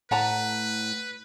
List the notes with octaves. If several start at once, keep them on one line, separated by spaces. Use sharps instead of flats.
A2 B4 F#5 A5 A#5